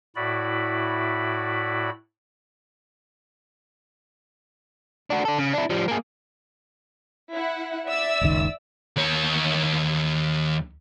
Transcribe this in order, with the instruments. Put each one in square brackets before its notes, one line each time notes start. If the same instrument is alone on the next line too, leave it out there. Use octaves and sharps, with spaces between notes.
[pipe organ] A2 E4 F#4 D5 B5
[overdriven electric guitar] D4 F#4
D4 A4
C#3
D4 E4
F3 G3
A#3 G#4
[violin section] E4 F#5
D5 E5 E6
[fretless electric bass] F#1 C#2 D#3
[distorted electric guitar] D#2 C#5